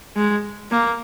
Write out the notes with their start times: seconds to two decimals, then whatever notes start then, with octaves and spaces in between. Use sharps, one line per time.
0.16 G#3
0.71 A#3